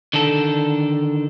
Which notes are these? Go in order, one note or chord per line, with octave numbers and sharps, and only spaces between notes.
D3 D#3 D4 A4